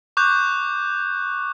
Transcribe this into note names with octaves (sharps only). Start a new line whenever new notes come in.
C#6 D6 F#6 G6